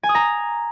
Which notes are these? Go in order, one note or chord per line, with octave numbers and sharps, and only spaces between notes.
G#5
D#6
A#5